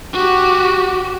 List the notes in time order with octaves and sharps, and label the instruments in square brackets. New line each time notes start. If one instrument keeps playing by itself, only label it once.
[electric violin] F#4 G4